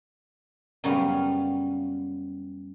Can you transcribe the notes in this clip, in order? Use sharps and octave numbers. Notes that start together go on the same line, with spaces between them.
F#2 C#3 G3 B3 F5